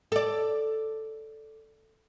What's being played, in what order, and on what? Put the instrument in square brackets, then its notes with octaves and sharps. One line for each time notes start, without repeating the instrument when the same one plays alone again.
[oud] A4 D5